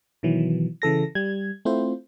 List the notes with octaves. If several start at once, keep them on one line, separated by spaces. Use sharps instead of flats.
B2 D#3 E3 F#3
C#3 E3 A4 A#6
G3 G#6
A3 C4 E4 F4 C5